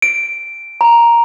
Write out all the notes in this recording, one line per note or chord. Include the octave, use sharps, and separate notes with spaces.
D7
A#5